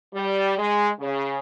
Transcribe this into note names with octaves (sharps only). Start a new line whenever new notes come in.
G3
G#3
C#3